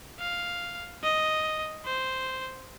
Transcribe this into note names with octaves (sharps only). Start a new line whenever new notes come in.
F5
D#5
C5